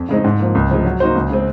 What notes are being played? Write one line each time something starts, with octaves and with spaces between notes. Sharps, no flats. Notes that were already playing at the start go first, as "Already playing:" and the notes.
Already playing: F2
C#3 G#3 C4 D#4
G#2
F3 A#3
C#2
C3 F3 G#3
F#3
A#3 D#4 F#4 C5
C#2
C#3 G#3 C4